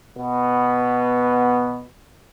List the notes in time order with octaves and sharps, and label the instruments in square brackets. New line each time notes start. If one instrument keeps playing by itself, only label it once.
[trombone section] B2 B3